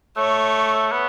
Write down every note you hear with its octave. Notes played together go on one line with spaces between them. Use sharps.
A3 C#5
B3